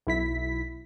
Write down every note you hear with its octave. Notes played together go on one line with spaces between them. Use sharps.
B1 E4 B6